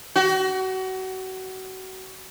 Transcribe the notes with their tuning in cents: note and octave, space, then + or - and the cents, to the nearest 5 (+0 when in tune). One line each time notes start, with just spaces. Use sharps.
F#4 +30